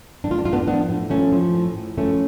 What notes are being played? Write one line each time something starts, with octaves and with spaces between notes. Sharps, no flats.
A2 D4
F4
D4
A2 F4
B3 D4
F3 B3 D4
A2
F3 A3 C#4
F3
A2
A2
F3 A3 C#4